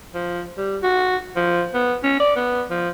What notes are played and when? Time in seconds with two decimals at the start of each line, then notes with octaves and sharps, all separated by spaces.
0.15 F3
0.57 G3
0.82 F#4
1.36 F3
1.74 B3
2.03 C#4
2.20 D5
2.36 B3
2.70 F3